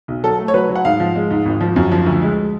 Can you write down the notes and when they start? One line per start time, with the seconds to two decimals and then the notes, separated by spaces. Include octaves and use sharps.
0.08 B1
0.23 F#3 A4
0.39 A3
0.48 C#5
0.54 F#3 B4
0.69 F#3
0.75 F#5
0.85 G#2 F5
1.00 F3
1.15 G#3
1.31 G#2
1.46 G#1
1.61 F3
1.76 F#2
1.92 F3
2.07 D2
2.22 G#3